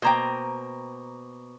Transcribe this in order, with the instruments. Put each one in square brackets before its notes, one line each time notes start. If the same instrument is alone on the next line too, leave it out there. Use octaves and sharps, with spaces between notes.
[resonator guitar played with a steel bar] B2 A#3 G5 [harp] C5 A#5